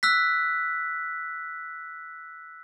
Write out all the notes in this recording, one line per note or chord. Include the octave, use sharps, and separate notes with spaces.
E6 F#6 B6